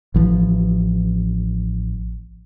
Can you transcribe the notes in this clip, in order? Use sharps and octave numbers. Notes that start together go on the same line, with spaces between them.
A1 E3 F3